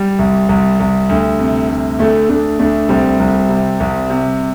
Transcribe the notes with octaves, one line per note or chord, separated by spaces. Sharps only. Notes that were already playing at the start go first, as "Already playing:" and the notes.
Already playing: G3
C2
C2
C2
D2
C3
D2
D2 A3
D2 A3 D4
D2 A3 D4
C2 G3 C4
C2
C3
C2
C3